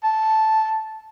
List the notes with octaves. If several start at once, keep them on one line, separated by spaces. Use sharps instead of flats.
A5